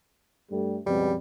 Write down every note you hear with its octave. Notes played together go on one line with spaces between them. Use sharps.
G2 G3 A3
C#2 F#2 B2 F3 G3 C4